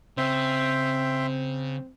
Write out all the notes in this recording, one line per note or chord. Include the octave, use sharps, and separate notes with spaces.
C#3 C4 E5 G5 C6